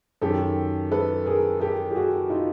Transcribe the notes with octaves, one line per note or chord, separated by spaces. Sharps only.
F#2 D#3 G4 A4
A4 B4
G#4 A#4
G4 A4
G4
F#4 G#4
D#4 F4